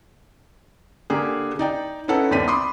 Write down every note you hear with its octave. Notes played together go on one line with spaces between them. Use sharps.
D3 A#3 G4 G#4
D#4 D5 G5
C#4 D#4 E4 A4 B4 F#5
G1 D#2 C4 D4 B6 D#7
B5 C6 D6 D#6